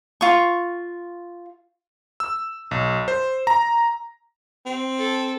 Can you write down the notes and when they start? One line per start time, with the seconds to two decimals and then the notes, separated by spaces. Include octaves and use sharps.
0.21 F4 C#6
2.20 E6
2.71 B1
3.08 C5
3.47 A#5
4.66 C4
4.98 A4